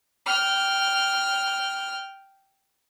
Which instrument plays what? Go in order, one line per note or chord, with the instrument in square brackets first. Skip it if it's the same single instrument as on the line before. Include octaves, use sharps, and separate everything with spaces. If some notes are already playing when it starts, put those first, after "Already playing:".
[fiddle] G5 F6